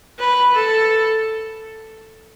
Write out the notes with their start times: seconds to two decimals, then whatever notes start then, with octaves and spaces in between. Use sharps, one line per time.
0.19 B4
0.55 A4